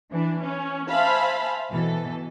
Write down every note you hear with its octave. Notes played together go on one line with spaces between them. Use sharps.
E3 D4
C#4
C5 E5 F5 G#5 A5 B5
B2 E3 A4